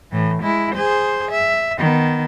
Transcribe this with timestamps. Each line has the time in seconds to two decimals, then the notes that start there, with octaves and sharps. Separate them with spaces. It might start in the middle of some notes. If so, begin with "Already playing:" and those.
0.11 A2 E3
0.43 G#3 E4
0.75 G#4 C5
1.31 E5
1.78 D#3 B3